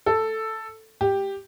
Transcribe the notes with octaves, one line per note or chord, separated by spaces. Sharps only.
A4
G4